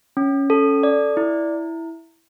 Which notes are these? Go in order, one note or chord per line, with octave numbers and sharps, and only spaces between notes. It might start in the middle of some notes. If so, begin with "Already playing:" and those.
C#4
A4
D5
E4